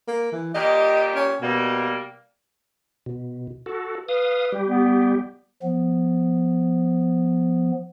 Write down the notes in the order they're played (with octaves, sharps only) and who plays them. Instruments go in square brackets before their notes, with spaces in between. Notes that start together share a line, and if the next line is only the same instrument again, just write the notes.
[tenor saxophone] A#3
E3
[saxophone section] A#2 G3 G4 [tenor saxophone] D#5
[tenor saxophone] C#4
[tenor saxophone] B2 [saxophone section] G3 A#3
[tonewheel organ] B2
F#4 A4
[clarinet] B4 [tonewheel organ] F5 D#6
[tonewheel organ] G3 G4
[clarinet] B3
[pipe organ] F3 B3